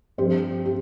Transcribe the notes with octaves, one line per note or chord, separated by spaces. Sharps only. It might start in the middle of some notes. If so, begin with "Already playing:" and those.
G2 F3 C4 G4 C5
G4